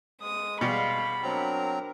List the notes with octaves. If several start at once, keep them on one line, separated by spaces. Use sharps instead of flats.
G#3 D#6
B2 G3 G#4 F5 B5
F#3 C4 D4 A#4 A#5